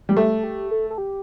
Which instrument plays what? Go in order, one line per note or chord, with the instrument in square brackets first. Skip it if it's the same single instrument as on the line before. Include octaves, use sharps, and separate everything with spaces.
[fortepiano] G3 [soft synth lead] G4
[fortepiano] A3 [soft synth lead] A4
[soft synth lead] G4
A4
A4
G4